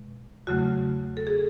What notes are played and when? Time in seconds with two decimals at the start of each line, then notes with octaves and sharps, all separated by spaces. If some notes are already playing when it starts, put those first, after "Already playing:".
Already playing: B2 G#3
0.47 E2 C#3 F#3 A3 F#4
1.17 A4
1.27 G#4